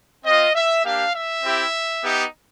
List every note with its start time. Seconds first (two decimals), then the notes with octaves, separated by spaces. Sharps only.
0.25 C4 F4 D#5
0.55 E5
0.84 A#3 D4 G4 F5
1.14 E5
1.44 C4 E4 G4
2.03 B3 D#4 G4